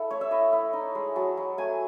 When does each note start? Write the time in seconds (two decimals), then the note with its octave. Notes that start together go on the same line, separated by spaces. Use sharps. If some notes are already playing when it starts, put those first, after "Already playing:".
Already playing: E4 A4
0.10 A3 C#5
0.21 E5
0.31 E4 D#5
0.52 E4 E5
0.73 D#4
0.95 G#3
1.16 F#3 A5
1.37 F#3
1.58 A3 G#5